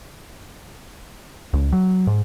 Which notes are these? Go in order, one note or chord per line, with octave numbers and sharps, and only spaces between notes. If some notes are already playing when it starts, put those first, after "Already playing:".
C#2
F#3
G#2